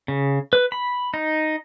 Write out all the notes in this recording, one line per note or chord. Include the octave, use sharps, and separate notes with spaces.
C#3
B4
B5
D#4